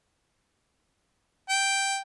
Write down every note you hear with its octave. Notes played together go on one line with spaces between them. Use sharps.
G5